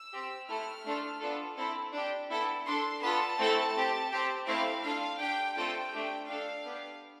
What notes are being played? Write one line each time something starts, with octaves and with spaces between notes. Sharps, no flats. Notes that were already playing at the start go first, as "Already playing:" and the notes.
Already playing: E6
C4 G4
A3 E4 A4 F6
A3 D4 F4 A4
B3 D4 F4 A4
C4 E4 A4
D4 G4
B3 E4 A4
D4 A4 C6
B3 F4 A4 A5
A3 C4 E4 A4
C4 G4
C4 G4
A3 C4 E4 F5
D4 F4 A4 F5
D4 G4 G5
A3 C4 F4 A4 G5
A3 D4 G4
D4 A4 F5
B3 D4 G4